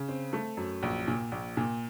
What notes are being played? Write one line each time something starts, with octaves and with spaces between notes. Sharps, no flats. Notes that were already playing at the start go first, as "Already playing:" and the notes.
Already playing: C#3
C4
A3
F#2
A#1
A#2
A#1
A#2